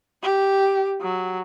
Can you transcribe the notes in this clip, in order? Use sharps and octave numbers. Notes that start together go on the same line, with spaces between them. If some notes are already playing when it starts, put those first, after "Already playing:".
G4
F#3